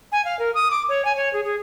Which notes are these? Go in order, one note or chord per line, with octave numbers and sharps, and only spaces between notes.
G#5
F5
A#4
D#6
D6
C#5
G#5
C#5
G#4
G#4